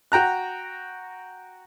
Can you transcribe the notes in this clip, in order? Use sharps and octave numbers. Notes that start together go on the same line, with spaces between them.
F#4 G5 A#5 F#6